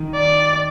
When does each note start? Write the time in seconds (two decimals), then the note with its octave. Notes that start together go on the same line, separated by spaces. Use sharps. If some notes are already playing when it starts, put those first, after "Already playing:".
Already playing: D#3
0.15 D5